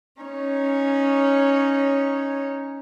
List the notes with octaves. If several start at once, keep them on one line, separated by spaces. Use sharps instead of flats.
C#4 D#4 C#5